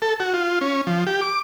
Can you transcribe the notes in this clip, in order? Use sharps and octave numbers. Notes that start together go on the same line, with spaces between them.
A4
F#4
F4
C#4
F3
G4
D6